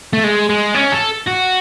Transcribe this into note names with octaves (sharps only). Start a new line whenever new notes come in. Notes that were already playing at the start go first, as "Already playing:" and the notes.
A3
G#3
G#3
C#4
A4
F#4